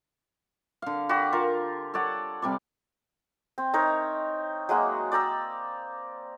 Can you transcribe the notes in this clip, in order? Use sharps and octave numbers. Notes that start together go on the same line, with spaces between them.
D3 F5
F#4 G4 D5 B5
F4 A#4
A4 C#5 D5 F#5
C3 G3 D5
C4
C4 D#4 A#4 C#5
F#3 G#3 A#3 F#4
D5 G5 A#5 E6